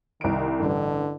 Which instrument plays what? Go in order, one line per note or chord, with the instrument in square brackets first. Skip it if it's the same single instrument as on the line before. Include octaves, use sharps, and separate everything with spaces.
[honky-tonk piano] C2 D7 [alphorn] D#3
[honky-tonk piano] A1 G2 [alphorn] D3